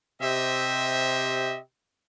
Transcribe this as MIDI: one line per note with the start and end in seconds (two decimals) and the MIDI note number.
0.21 1.58 48
0.21 1.58 67
0.21 1.58 72
0.21 1.58 75
0.21 1.58 76